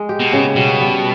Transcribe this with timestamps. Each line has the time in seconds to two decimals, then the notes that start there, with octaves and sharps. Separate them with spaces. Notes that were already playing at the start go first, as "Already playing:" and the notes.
Already playing: G#3
0.09 G4
0.20 B2
0.33 C#3
0.56 B2 G3
0.81 G3